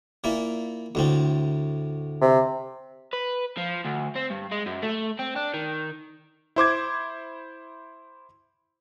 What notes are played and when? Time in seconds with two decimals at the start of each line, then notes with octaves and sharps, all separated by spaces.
0.24 A#2 A#3 E4
0.95 D2 A2 C4
2.21 C3
3.13 B4
3.58 F3
3.85 D2
4.16 C4
4.30 G2
4.52 G#3
4.66 F#2
4.83 A3
5.19 C4
5.36 D4
5.54 D#3
6.56 E4 C5 D6 G#6